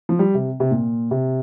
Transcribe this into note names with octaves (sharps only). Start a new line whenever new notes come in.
F3
G3
C3
C3
A#2
C3